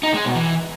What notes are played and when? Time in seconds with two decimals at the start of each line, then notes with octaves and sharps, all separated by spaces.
0.03 D#4
0.14 G#3
0.24 B2
0.35 E3